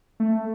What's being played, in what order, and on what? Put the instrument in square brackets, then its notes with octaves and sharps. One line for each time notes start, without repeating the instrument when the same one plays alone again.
[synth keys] A3